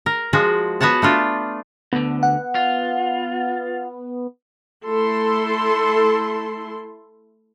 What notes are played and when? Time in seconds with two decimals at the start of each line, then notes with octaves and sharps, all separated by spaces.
0.06 A#4
0.33 F3 G#3 F#4 F#5
0.81 B3 F#4 C#5 F#5 A5
1.02 A3 D4 F4
1.93 D2 D3 B3
2.23 F#5
2.55 F4
4.86 A3 E4 A4 C6